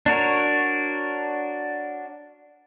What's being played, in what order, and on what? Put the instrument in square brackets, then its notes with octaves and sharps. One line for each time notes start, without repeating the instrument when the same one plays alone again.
[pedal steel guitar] D4 F#4 A#4 C#5